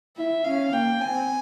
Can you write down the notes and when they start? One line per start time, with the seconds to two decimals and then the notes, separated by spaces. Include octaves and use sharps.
0.17 E4 E5
0.44 C#4 F5
0.73 A#3 G5
1.00 C4 G#5